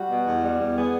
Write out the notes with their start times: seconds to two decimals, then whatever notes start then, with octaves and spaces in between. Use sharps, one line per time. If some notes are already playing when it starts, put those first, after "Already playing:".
Already playing: G3 F#4
0.10 B2
0.26 E2
0.43 G3
0.59 E2
0.76 B3 G#4